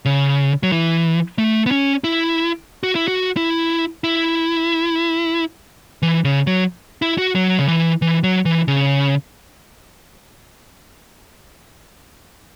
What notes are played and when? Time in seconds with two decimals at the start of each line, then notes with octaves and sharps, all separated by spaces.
0.05 C#3
0.63 F#3
0.72 E3
1.38 A3
1.66 B3
1.71 C#4
2.04 E4
2.83 F#4
2.95 E4
3.08 F#4
3.37 E4
4.04 E4
6.02 E3
6.24 C#3
6.47 F#3
7.02 E4
7.18 F#4
7.35 F#3
7.59 C#3
7.68 E3
8.02 E3
8.23 F#3
8.45 E3
8.68 C#3